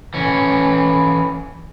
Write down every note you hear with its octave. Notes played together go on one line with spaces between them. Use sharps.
E3 C#4